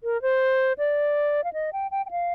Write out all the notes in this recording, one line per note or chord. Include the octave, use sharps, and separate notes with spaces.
A#4
C5
D5
F5
D#5
G5
G5
G5
F5